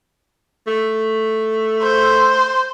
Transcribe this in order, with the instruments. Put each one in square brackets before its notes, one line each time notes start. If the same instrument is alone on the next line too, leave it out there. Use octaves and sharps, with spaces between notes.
[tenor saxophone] A3
[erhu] C5